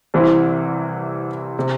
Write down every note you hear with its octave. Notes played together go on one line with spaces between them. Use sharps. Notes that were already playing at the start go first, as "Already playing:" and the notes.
C2 C3 E3 C4 E4
C3